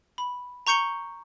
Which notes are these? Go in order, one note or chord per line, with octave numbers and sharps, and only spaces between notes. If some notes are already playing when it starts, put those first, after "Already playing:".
B5
A#5 C#6 G6 C#7 G7